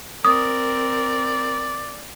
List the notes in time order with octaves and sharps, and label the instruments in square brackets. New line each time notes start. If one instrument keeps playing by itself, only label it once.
[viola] C4 A#4 [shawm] D5 [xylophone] D#6